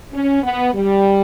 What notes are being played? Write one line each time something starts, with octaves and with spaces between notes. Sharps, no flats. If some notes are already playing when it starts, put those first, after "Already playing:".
C#4
B3
G3